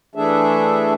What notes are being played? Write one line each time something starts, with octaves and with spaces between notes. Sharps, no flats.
E3 A3 D4 G#4 A4 E5